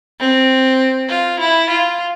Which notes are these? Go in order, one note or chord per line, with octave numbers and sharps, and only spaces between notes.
C4
F4
E4
F4